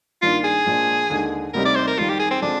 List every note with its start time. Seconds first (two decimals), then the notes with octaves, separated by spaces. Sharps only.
0.22 G2 D#3 A#3 D4 F4
0.44 G#4
0.66 A#2 F3 G#3 D4
1.10 D#2 D3 G#3
1.54 D2 C3 G3 C4 D#4 A#4
1.65 D5
1.75 C5
1.88 A#4
1.98 F2 D#3 G3 F4
2.09 G4
2.20 G#4
2.31 C4
2.42 D3 F3 G#3 C4 D4